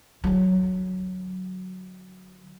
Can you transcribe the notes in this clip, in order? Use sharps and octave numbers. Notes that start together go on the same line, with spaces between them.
D3 F#3